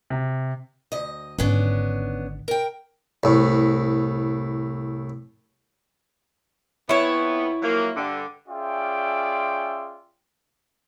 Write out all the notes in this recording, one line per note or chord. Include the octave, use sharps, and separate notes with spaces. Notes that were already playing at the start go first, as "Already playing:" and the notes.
C3
D2 D#5
G#1 D3 B3 C#4 D4
A#4 G5
C2 A2
F2 B3 E4 C#5
F3 F#3 A#3
G2 D3
C#4 F4 G#4 D5 E5 G5